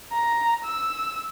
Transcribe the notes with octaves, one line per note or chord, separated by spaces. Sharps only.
A#5
E6